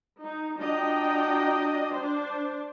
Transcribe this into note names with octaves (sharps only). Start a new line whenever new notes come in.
D#4
D4 F4 F#4 D#5 G5 A#5
D4 C5